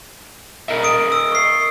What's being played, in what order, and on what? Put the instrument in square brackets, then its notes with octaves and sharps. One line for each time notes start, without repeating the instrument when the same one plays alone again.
[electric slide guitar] A#4 D#5 E5
[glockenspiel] D#6 D7
E6
C#6 C7